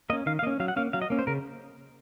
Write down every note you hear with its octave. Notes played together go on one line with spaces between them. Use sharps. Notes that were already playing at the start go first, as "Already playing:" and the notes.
A#3 C#4 D#5
D#3 F5
F5
A#3 C#4 D#5
F#3 F5
F#5
A#3 C#4 F5
F#3 F5
D#5
A#3 C#4
C5
C#3 A#4